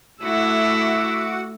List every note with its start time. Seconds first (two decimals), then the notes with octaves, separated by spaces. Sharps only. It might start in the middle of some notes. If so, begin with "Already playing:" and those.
0.22 A3 E4 F#4 F#5 D6 E6